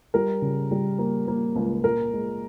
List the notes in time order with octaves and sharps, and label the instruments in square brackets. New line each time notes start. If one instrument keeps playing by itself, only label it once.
[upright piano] G3 A#4
C#3
G3
A#3
A#3
C#2
A#2 A#4
G#3